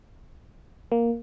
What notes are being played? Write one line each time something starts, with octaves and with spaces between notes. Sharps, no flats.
A#3